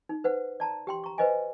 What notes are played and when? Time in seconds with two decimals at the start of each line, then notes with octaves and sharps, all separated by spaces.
0.09 D#4
0.24 B4 C5 F#5
0.60 D5 A5 A#5
0.87 G4 G5 C6
1.04 A#5 C#6
1.18 B4 C5 D#5 F5 G#5